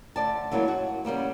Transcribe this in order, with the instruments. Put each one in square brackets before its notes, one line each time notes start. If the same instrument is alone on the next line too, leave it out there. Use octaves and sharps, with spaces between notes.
[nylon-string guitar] D2 D5 A5
E3 F#3 G#3 A#3
F#4
C#3 G3 A#3 B3